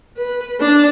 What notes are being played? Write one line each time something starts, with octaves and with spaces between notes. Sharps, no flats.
B4
D4